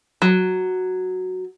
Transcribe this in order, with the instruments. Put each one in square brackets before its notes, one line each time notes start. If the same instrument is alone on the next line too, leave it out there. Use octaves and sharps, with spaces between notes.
[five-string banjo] F#3